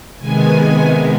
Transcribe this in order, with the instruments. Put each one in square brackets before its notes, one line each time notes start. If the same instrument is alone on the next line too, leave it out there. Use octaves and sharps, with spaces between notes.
[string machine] C3 D#3 G#3 B3 G#5